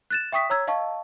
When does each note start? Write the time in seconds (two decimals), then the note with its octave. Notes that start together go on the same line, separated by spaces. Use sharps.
0.10 F#6 A6 E7
0.32 E5 G5 C#6 D#6 B6
0.50 C#5 A#5 E6 G#6
0.68 D#5 F5 A5 C#6